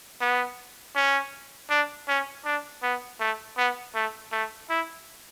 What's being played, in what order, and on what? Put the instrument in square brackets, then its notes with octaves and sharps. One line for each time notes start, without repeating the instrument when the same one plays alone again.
[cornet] B3
C#4
D4
C#4
D4
B3
A3
B3
A3
A3
E4